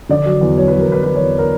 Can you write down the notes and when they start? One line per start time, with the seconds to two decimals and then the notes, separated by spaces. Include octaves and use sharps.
0.09 D3 D5
0.25 F#3
0.41 E2
0.57 F#3 C#5
0.68 B4
0.73 F#3
0.79 A#4
0.88 E2 B4
1.03 F#3 B4
1.15 C#5
1.19 E2
1.38 A#4